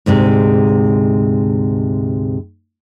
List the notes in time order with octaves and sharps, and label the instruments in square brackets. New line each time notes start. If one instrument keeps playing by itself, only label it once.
[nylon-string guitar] D2 G#2 C3 G#3